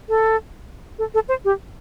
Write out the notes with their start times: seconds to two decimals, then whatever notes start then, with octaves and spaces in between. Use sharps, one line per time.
0.09 A4
0.99 A4
1.14 A4
1.29 C5
1.45 G4